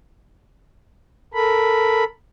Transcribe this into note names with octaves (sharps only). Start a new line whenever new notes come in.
A4 A#4 B5